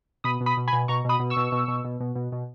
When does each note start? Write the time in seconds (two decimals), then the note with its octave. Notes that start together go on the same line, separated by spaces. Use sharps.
0.24 B2 B5 D#6
0.41 B2
0.46 B5 D#6
0.57 B2
0.68 G#5 B5
0.73 B2
0.88 B2 A#5 C#6
1.05 B2 B5 D#6
1.20 B2
1.30 C#6 E6
1.37 B2
1.52 B2
1.68 B2
1.85 B2
2.00 B2
2.15 B2
2.32 B2